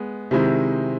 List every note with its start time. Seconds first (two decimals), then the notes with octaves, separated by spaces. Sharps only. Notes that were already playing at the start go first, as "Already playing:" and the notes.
Already playing: G#3 B3
0.31 C3 D#3 G#3 C4 E4